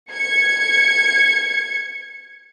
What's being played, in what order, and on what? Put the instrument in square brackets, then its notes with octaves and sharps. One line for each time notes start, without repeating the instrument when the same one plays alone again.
[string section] G#6 C#7